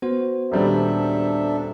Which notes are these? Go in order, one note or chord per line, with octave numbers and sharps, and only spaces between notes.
B3 F#4 C5
D#1 G3 D4 A4 E5